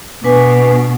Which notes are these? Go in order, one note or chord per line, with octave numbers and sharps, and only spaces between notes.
B2 D4 B4 G#5